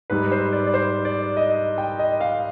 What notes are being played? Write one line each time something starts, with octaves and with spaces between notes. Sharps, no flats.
G#2 G3 B4
C5
D5
D5
C5
D5
D#5
G5
D#5
F5